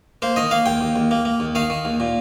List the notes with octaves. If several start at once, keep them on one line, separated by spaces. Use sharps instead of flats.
A#3 C5
D#3 D#5
A#3 F5
D#2 G5
D#2
D#2
A#3
A#3
D#2
D#3 F5
D#3
D#2
A#2